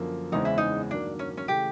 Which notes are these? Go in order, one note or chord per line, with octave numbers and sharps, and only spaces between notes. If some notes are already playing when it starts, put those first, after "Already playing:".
Already playing: F#2 D3 F3 A#3
E2 C#3 E3 G#3 C4 D#4
E4
D#4
G2 D#3 F#3 A#3 D4
C#4
C#4
C#3 E3 A3 G4